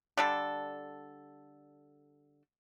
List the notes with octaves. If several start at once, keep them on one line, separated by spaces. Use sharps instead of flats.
D3 G3 A4